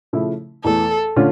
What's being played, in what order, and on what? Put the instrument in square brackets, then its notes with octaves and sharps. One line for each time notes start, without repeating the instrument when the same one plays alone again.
[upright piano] C#3 F3 A3 E4
[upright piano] E2 E3 A3 [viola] A4
[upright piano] D3 A3 C#4 F4